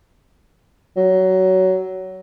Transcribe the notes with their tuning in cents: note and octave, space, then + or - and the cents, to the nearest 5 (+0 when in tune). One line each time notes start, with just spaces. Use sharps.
F#3 +20